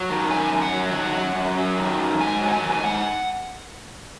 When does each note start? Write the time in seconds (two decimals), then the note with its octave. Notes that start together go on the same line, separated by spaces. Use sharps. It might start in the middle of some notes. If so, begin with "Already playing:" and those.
Already playing: F#3
0.10 D#3
0.30 F#2 G#5
0.51 F#2
0.62 F#5
0.73 F#3
0.93 D#3 F#5
1.15 F#2
1.35 F#2
1.57 F#3
1.77 D#3
1.99 F#2
2.20 G#2 G#5
2.41 F#3
2.48 F#5
2.52 G#5
2.62 D#3
2.72 G#5
2.83 G#2 F#5